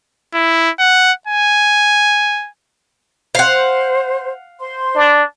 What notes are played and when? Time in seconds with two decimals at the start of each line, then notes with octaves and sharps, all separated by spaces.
0.34 E4
0.80 F#5
1.27 G#5
3.35 C5 F5 F#5
4.59 C5 C6
4.95 D4